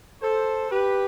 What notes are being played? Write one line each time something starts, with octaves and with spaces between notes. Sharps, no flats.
A4 C5
G4 B4